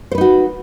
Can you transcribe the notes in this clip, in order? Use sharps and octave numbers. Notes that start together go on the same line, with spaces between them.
D#4 F#4 B4 C5